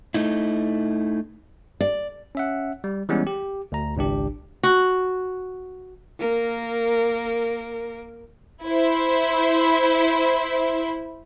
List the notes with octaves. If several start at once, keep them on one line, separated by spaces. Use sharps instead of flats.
A3 D#4 E4
D5
C#4 E5 F#5
G3
E3 G3 G#3 B3 C#4
G4
D2 A#5
G#1 C#2 D4 G4
F#4
A#3 A#4
E4 C5